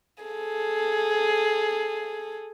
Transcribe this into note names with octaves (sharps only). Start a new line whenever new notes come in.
G#4 A4